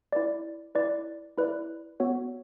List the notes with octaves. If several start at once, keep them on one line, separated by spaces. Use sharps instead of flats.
E4 B4 D5
E4 B4 D5
E4 B4 D5
B3 F#4 C#5